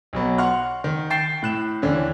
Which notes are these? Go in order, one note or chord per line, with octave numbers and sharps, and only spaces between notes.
B1 F#3 B3
F#5 C6 C#6 F6 F#6
D#3
G5 C#6 G6 A6 C7 E7
A2 F#6 E7
D#2 D3 E3 C#4